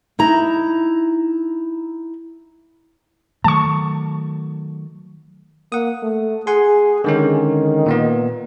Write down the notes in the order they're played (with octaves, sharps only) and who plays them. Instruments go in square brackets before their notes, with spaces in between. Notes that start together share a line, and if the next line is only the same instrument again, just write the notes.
[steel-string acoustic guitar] D#4 E4 A#5
[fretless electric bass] D#3 F#3 A3 [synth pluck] A5 C#6
[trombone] A#3 [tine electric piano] F#5 D#6
[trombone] A3
[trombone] G#4 [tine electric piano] F#5 G#5 C6
[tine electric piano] D3 G#3 C#4 [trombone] D#3
[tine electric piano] A#2 A#3 B3